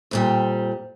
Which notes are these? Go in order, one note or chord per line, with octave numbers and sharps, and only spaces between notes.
F2 A#2 G3